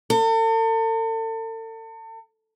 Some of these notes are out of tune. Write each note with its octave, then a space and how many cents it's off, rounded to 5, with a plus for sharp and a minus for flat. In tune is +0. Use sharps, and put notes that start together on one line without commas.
A4 +40